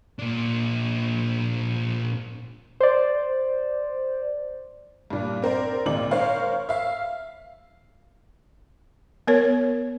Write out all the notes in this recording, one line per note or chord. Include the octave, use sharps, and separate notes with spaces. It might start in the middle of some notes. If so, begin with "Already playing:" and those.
A#2 D4
C5 D5
G2 A#2
C4 A#4 C5 D5
G#1 A#2 G#3 C4 D5 F#7
A#4 C5 C#5 F5
E5 F5
B3 A#4 C#5